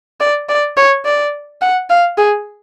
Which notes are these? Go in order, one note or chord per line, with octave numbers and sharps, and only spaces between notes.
D5
D5
C#5
D5
F#5
F5
G#4